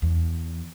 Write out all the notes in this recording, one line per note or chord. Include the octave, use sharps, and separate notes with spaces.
E2